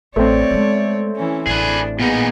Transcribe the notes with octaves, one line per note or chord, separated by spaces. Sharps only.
A1 A3 C4 C#5 D5
G#3 B3
E3 C#4
A1 D4 G#4 B4
A#2 B3 D#4 G#4